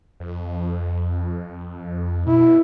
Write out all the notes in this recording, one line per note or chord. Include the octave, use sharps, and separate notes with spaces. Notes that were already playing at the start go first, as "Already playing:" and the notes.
F2
B2 E4